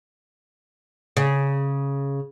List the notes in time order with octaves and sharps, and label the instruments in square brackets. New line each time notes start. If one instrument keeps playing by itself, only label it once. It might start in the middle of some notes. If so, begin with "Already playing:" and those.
[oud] C#3